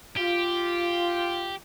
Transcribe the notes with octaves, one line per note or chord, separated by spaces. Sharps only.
F4 G4